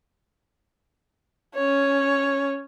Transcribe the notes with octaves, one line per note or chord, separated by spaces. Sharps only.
C#4 C#5